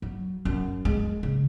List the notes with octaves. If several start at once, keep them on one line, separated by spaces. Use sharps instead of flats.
F#3
F#2
G#3
C#3